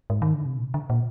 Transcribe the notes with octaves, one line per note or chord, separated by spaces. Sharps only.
G#2
D#3
D3
C3
A#2
D3
A#2